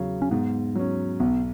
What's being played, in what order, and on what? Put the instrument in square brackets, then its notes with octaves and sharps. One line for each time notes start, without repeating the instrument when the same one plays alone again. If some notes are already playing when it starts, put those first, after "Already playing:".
Already playing: [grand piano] E2 C#3 F#3
[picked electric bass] C#4
[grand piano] G#2 [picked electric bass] B3
[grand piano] F#3 C#4
[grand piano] B1 [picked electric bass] B3